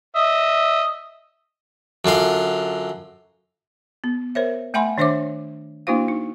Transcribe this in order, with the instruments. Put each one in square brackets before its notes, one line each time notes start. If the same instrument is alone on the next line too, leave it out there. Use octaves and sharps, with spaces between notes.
[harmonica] D#5 E5
[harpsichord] F#2 D3 F4 F5
[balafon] B3
A#4 C5 C#5 E5
A3 E5 F#5 G#5 B5 C6
D#3 D4 C5 C#5 E5 D6
A#3 D4 E4 F#4 C5 F5
D#4